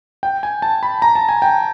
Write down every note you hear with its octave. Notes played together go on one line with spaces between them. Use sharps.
G5
G#5
A5
B5
A#5
A5
G#5
G5